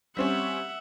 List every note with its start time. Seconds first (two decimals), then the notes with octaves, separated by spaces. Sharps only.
0.17 G3 C4 C#4 E5 F#5